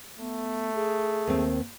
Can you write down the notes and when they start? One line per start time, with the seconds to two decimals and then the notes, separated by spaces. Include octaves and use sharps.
0.19 A3 B3
0.74 G#4
1.27 D#2 C4